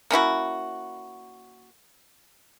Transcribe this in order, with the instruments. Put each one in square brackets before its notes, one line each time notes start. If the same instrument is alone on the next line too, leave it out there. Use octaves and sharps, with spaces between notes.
[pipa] A#3 C#4 E4 F#4